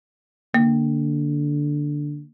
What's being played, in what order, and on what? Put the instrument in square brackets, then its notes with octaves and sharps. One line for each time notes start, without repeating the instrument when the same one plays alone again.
[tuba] D3 [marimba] A#3